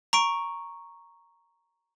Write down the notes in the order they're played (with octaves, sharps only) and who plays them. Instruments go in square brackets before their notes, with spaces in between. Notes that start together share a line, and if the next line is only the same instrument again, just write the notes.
[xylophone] A#5 C#6 D7